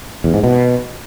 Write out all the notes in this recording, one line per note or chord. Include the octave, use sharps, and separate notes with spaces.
E2
G#2
B2